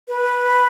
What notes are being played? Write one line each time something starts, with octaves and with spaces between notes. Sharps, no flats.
B4